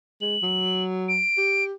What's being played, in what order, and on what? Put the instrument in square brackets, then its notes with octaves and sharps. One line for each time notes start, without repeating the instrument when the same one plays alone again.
[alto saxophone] G#3 [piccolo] F#7
[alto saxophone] F#3
[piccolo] D7
[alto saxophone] G4